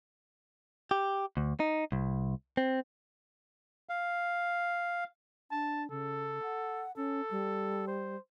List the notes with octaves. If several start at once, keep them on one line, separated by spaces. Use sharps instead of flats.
G4
D2
D#4
C2
C4
F5
D4 A5
C#3 A4
F#5
C#4 A4
G3
C5